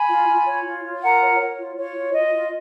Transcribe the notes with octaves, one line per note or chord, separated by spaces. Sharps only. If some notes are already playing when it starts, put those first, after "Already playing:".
Already playing: G#5 B5
F4
F4
C#5
F4
F4
A#4 F#5 A#5
C#5
C#5
F4
F4 C#5
F4
F4 D#5
F4